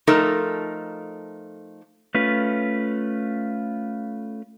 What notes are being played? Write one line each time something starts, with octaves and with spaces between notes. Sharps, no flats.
F3 A3 D#4 A4 A#4
A3 C#4 F4 B4